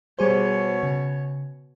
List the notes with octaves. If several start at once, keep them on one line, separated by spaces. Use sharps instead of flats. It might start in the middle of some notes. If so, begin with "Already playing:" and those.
B2 G3 G#4 C5 C#5
C#3